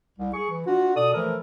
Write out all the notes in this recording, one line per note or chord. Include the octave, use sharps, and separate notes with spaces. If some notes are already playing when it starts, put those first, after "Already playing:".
C2
G#4 C#6
E3
D4 F4 F#4
B2 A4 D5 D#6
E3 F3 A3 A4 A#4